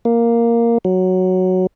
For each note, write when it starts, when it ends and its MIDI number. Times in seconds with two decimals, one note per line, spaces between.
0.05 0.78 58
0.85 1.67 54